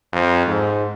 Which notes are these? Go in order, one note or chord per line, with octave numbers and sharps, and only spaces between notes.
F2
G#2